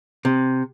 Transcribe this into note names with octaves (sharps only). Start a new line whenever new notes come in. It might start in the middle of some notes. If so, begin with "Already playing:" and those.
C3